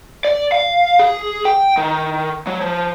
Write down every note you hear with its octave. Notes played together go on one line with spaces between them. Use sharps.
D5
F5
G#4
G5
D#3
F#3
F3